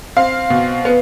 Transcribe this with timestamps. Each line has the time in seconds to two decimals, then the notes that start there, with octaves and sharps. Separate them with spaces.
0.16 C4 F5
0.50 B2
0.85 B3